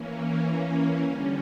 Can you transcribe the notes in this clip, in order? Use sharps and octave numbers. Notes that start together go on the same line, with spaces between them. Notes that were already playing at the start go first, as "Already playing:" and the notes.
Already playing: E3 A#3 C#4
A#4
C#5
D3 G3 C#4 A#4